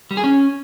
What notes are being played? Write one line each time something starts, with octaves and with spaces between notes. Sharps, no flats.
G3
G#4
C#4